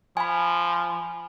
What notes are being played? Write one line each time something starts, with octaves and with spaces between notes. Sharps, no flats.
F3 G#5 B5